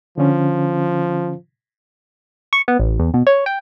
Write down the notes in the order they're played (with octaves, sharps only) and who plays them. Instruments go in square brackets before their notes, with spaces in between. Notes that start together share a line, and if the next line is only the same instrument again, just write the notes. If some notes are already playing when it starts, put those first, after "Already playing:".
[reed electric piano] D3 C#4 [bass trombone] F3
[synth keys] C#6
B3
A1
E2
B2
C#5
G5